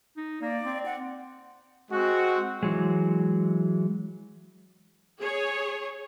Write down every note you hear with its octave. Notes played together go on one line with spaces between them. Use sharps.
D#4
A#3 D5
C4
F#5
G#3 C4 F#4
E3 F#3 G#3
G#4 C#5